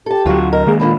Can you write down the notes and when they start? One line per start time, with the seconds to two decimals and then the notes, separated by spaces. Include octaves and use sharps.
0.06 G4 A4 A5
0.26 D2 F#3 F4 F#4
0.53 A#4 D#5
0.67 D#3 G#3 A#3 G#4
0.80 A#2 D3 D4 B5